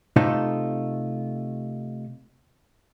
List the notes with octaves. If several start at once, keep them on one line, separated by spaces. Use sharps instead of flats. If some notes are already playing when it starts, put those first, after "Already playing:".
C3 A3 D#4 F4 A4